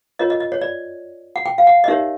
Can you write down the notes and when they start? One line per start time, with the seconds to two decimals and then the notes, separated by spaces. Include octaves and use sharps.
0.19 F4 A#4 C#5 D#5
0.30 D#5
0.40 D#5
0.52 C#5
0.61 D5
1.36 F#5
1.46 G5
1.58 F5
1.67 F#5
1.84 D#5
1.88 D#4 G4 A#4 C#5 E5